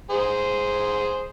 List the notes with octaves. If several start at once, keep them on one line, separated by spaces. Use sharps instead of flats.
G#4 C5